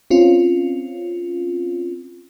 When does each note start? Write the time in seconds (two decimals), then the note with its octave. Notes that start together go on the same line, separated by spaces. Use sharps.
0.10 C4 C#4 F4